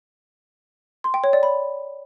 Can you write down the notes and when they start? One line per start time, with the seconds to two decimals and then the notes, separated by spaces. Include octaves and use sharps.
1.04 C6
1.14 G5
1.24 C#5
1.33 D5
1.43 B5